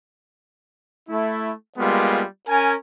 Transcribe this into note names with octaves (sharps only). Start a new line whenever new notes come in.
A3 E4
G3 G#3 A#3 B3 F4
C#4 A#4 G#5